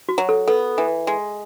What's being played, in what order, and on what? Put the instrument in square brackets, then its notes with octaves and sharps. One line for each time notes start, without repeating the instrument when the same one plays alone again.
[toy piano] F#4
[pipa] F#3
[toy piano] A4
[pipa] B3 [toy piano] A4
[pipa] E3
G#3